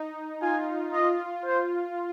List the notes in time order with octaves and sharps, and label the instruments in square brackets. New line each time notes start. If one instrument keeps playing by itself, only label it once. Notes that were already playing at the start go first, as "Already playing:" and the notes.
Already playing: [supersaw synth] D#4
[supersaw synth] F4 [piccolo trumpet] G#5
[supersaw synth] F4 [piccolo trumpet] D#5
[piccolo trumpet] C5